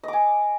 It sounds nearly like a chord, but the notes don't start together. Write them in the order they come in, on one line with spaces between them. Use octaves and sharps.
D#5 D6 G#5